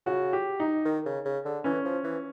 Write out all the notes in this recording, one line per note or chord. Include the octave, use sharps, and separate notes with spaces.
C#3 F#4
G4
D#4
D#3
C#3
C#3
D3
E3 C#4
F3
E3